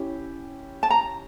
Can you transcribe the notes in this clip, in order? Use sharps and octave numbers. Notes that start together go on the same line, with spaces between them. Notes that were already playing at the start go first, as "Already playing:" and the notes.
Already playing: C#4 E4 G4
A5
A#5